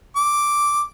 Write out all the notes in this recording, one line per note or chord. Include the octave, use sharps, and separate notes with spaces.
D6